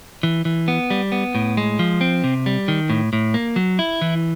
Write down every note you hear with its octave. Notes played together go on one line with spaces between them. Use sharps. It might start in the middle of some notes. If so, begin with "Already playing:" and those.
E3
E3
B3
G3
B3
A2
G#3
F3
C4
C3
G3
D#3
A2
A2
A#3
F#3
E4
E3